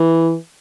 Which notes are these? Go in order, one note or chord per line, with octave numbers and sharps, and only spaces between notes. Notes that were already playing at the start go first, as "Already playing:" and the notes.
Already playing: E3